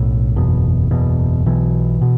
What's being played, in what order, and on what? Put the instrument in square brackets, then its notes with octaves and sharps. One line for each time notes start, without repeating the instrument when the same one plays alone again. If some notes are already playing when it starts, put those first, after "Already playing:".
Already playing: [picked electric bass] B1 A2
F#1 E2 B2
F#1 E2 B2
B1 B2 E3
B2